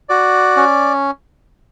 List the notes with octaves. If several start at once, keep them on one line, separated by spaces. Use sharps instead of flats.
F#4 D5
C#4